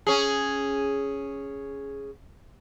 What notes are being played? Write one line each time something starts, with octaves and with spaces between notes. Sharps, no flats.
C#4 G#4